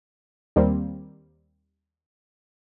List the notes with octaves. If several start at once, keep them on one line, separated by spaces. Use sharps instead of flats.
D#2 G3 A#3 C4